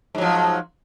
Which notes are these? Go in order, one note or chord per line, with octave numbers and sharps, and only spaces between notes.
G#2 F3 F#3